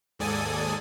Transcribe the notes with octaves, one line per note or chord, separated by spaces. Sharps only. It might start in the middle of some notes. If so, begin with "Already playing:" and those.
D#2 G#2 A4 D5 G#5 D#6